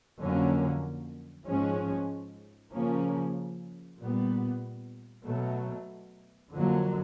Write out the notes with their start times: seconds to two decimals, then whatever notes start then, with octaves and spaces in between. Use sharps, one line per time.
0.20 F2 D3 F#3 A#3 C#4
1.47 G#2 F3 G#3 C#4
2.73 C#3 F3 A#3 C#4
3.99 A#2 G3 B3
5.26 B2 F#3 A3
6.53 F2 D3 F#3 A#3